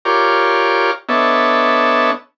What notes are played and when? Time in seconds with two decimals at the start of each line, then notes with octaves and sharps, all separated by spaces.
0.05 F4 G4 A#4 C#5 D5
1.09 B3 D4 A4 C#5 D#5 E5